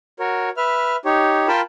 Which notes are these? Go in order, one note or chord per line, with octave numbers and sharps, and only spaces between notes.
F#4 A#4 C#5
B4 E5 F6
D#4 G4 C#5
F4 A#4 G5 A5 B5